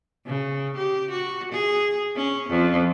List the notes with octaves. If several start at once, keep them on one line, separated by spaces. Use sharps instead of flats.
C#3
G4
F#4
G#4
C#4
F2